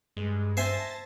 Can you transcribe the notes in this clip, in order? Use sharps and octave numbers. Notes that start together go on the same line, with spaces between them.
G2 G#3
C5 E5 G#5 A5 A6 A#6